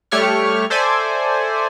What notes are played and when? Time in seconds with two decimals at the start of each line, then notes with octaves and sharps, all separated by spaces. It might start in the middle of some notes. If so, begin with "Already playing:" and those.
0.11 G3 A3 G4 C#5 C#6 F6
0.70 A4 C5 D5 E5 G#5